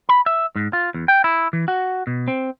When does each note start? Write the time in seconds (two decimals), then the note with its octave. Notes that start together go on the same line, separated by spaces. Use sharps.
0.09 B5
0.26 E5
0.56 G#2
0.73 F4
0.94 E2
1.08 G5
1.24 E4
1.53 E3
1.68 F#4
2.07 B2
2.28 C4